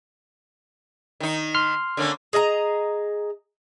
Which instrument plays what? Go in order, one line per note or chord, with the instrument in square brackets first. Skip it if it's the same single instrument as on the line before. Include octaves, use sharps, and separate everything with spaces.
[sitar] D#3 D#4
[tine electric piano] C6 F6 C7
[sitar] D3 A#3 C#4
[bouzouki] G#4 D#5 F5 A#5